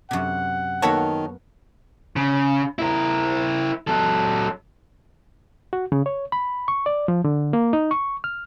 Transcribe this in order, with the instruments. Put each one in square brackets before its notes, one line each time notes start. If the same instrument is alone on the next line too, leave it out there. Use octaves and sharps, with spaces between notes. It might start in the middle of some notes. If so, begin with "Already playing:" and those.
[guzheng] F#2 C3 [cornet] F#5
[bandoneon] D#3 [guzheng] A#3 B3 B4 [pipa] F#4 A4 C#5
[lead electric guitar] C#3
E4 A#4
F#3 A4
[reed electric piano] F#4
C#3
C#5
B5
C#6
D5
F3
D3
A#3
D#4
C#6
F6